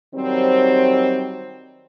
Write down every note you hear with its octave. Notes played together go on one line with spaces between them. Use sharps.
D#3 F#3 G3 C4